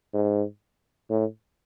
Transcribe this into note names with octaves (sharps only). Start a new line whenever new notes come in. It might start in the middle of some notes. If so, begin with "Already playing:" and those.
G#2
A2